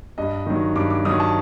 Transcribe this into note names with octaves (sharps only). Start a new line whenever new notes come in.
G2 D#5
D#3 F#3
G2 D6
D6
D#3 F#3 D#6
A5